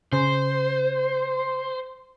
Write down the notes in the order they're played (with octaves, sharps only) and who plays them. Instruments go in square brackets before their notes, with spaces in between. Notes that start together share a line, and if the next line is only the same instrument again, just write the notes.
[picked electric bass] C#3 [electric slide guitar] C5